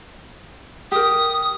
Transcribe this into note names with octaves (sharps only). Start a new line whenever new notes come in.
G4 A#4 D#6